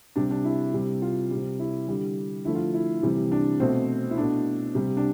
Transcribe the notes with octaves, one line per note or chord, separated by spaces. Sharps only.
C3 G3 D4
D4
E4
C3 G3
F4
C3 G3
E4
D3 G3
D3 F3 A3 E4
F4
E4
C3 E3 G3
D4
B2 A3 C4
E4
B2 A3 D4
C3 G3
D4